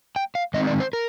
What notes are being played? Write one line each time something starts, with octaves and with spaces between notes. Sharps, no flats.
G5
F5
D#3 G#3 C4 D#4 D#5
D5
C5
A#4